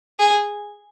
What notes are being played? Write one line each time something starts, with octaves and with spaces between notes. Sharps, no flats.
G#4